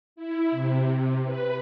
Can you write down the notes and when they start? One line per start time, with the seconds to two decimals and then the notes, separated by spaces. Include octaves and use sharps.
0.16 E4
0.51 C3
0.93 C3
1.24 B4